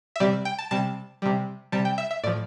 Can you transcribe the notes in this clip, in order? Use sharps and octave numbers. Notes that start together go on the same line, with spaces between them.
E5
C3 G3 D5
G5
A5
C3 G3 A5
C3 G3
C3 G3 A5
G5
E5
E5
A2 F3 D5